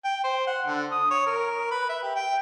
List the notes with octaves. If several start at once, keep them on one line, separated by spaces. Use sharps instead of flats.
G5
C5
F#5
D3
D#6
C#5
A#4
B4
E5
G4
G5